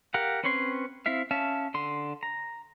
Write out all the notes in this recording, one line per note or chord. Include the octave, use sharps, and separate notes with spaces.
G4 A#4 F5 F#5
C4 C#4 B4 C#5 C6
C4 E4 E5 F5
C#4 E5 F5 A5
D3 C6
A#5